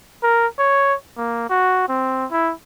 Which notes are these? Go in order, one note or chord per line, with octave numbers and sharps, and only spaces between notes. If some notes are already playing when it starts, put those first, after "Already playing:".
A#4
C#5
A#3
F#4
C4
E4